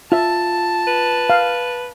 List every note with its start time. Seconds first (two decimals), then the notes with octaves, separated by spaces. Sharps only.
0.12 F4 E5 A5
0.87 B4
1.30 F5